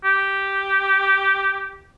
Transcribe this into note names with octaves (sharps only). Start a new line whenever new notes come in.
G4